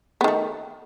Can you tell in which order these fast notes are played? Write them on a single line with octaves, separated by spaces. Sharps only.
B3 D#3 A3